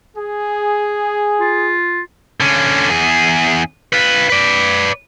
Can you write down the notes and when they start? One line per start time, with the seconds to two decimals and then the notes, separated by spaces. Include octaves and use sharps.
0.16 G#4
1.41 F4
2.40 D3 C#4
2.89 E2 G#4
3.93 F4 B4
4.30 B4 D5